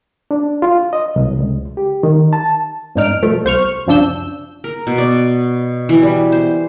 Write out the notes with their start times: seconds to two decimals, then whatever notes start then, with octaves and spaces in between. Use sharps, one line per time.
0.31 D4
0.62 F4
0.93 D#5
1.16 C2
1.39 C#2
1.77 G4
2.03 D#3
2.33 A5
2.95 F2 G#2 D4 D#4 F6 D7
3.22 B2 F3 A3
3.44 C2 C5 C#6 F6
3.87 C#2 F#2 F3 D4 E6 G6
4.64 A#4
4.87 B2
4.98 D5
5.89 E3
6.02 G3
6.32 C5